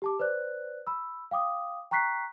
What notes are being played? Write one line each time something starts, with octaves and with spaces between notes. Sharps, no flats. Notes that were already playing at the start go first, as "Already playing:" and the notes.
G4 A5 D6
B4 C5 D5 F#6
B5 E6
F5 G5 D6 D#6
G5 A#5 C#6 F#6 B6 C7